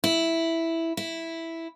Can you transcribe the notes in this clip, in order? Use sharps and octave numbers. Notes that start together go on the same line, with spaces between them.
E4
E4